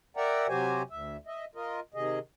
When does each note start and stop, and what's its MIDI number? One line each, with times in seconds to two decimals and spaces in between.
0.17 0.47 70
0.17 0.47 74
0.17 0.47 76
0.17 0.47 78
0.17 0.47 79
0.17 0.47 82
0.48 0.82 48
0.48 0.82 54
0.48 0.82 66
0.48 0.82 67
0.48 0.82 72
0.48 0.82 80
0.90 1.17 38
0.90 1.17 76
1.27 1.45 75
1.27 1.45 76
1.55 1.80 65
1.55 1.80 70
1.55 1.80 75
1.94 2.19 48
1.94 2.19 51
1.94 2.19 68
1.94 2.19 75